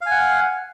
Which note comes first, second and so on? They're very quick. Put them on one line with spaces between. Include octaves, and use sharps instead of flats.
F5 G#5 F#5